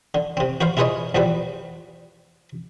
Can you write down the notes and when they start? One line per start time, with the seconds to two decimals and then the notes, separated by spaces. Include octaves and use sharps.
0.15 D3
0.37 C3 C4
0.61 F#4 B4 C5 F5
0.77 E4 F4 G#4 B4 C#5 D#5
1.15 B1 E2 F3 G3 B4